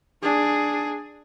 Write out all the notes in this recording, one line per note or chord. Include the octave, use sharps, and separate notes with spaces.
D4 G#4